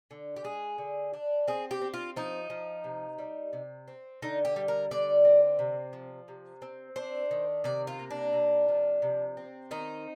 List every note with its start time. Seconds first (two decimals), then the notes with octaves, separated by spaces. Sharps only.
0.11 D3
0.36 G4
0.44 G#3 G#4
0.78 D3
1.14 D4
1.48 C4 G#4
1.71 G4
1.82 C4
1.94 F4
2.16 F3 D#4
2.50 F3
2.84 C3
3.18 G3
3.53 C3
3.88 C4
4.22 D3 D#4
4.45 G4
4.56 G3
4.68 A#4
4.91 D3 D5
5.25 C4
5.59 C3
5.93 F3
6.28 C3
6.62 C4
6.96 D4 C5
7.31 D#3
7.64 C3 D5
7.87 F4
7.99 A#3
8.11 D4
8.33 C3
8.68 F3
9.02 C3
9.37 C4
9.71 D#3 D#4